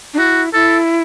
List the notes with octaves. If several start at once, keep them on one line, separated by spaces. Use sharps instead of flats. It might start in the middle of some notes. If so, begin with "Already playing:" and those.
D4
E4 F#4
E4 A4